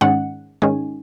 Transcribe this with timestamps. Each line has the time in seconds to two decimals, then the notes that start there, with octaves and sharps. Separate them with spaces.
0.01 G#2 D#3 G#3 C#4 F#5
0.62 G#2 D#3 G#3 C#4 G#5